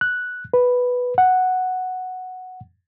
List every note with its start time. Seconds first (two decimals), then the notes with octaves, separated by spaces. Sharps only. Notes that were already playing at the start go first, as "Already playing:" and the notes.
0.01 F#6
0.54 B4
1.18 F#5